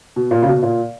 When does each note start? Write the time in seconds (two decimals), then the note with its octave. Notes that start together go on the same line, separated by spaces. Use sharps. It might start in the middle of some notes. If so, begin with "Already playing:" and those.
0.16 B2
0.31 A#2
0.42 C#3
0.47 B2
0.63 A#2